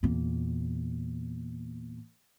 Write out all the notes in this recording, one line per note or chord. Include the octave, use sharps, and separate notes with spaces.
E2 A#2